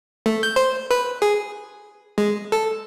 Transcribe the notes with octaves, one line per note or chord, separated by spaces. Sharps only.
A3
G6
C5
B4
G#4
G#3
A4